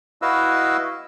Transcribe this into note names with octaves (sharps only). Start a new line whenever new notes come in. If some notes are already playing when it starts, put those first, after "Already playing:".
E4 F#4 B4 D#5 F5 E6